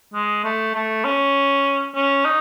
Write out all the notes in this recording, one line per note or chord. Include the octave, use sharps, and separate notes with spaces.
G#3
A3
A3
C#4
C#4
D#4